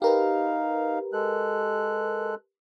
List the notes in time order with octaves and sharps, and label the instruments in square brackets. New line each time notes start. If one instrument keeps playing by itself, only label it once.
[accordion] D#4 F5 [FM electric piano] G4 A#4 B4
[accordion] G#3 A4 F#6